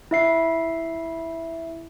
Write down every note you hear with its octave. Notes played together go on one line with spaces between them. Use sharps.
E4 E5 C7